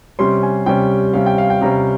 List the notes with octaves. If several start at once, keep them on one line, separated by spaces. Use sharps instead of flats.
C3 G3 C#4 C6
G#5
C3 G3 C#4 G5
C3 G3 C#4 F5
G5
F5
G5
C3 G3 C#4 A#5